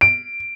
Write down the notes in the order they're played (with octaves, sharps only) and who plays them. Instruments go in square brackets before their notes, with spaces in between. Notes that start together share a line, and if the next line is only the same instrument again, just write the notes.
[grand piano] D7